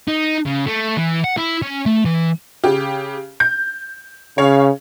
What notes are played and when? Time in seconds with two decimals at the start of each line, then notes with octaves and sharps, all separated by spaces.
0.08 D#4
0.46 C#3
0.66 A3
0.97 E3
1.24 F#5
1.37 E4
1.62 C#4
1.86 A3
2.05 E3
2.64 C#3 G4
3.40 G6
4.38 C#3 C#5 F5